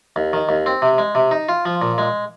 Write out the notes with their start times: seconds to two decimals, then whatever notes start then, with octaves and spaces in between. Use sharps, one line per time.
0.16 D#2
0.33 D#3
0.49 D#2
0.66 C4
0.82 C3
0.98 G#3
1.15 C3
1.31 D#4
1.49 F4
1.65 F3
1.82 A#2
1.98 G#3